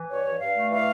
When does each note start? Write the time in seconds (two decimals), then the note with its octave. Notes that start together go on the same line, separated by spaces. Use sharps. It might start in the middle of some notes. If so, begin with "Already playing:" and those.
Already playing: E3
0.09 G2 C#5
0.25 G2
0.40 G2 F5
0.55 A3
0.72 E3 F5